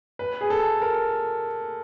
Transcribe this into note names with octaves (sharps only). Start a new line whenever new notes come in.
B4
G#4
A4
A#4